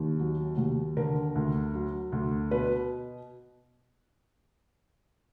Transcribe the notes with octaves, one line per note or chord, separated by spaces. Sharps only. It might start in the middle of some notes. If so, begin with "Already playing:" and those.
Already playing: D#2 D#3
F#3
D#2
D3 A#4
D2
F#3
D2
B2 B4